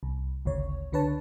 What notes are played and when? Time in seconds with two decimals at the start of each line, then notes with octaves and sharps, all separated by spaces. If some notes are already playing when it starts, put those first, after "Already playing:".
0.03 C2
0.45 G#1 D2 C#3 C#5
0.92 C#2 D3 D4 B4 C#5 A5